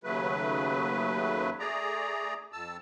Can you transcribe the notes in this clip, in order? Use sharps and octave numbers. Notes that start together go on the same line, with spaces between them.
D#2 C#3 F#3 A3 B4
A3 G#4 D5 A#5
F2 A5 E6